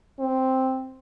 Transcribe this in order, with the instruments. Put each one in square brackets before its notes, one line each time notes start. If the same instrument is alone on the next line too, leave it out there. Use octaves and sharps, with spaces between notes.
[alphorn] C4